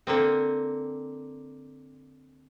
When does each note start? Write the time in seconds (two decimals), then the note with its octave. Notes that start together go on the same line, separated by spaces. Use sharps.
0.07 D3 A#3 C4